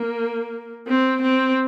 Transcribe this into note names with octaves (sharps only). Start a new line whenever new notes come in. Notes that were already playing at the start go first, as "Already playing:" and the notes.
Already playing: A#3
C4
C4